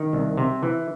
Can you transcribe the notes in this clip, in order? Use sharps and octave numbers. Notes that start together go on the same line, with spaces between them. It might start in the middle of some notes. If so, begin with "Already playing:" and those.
Already playing: D#3
C2
C3
E3